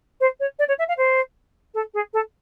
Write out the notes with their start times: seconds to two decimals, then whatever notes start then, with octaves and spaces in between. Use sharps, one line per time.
0.20 C5
0.40 C#5
0.59 D5
0.68 C#5
0.78 E5
0.88 F5
0.97 C5
1.74 A4
1.94 G#4
2.13 A4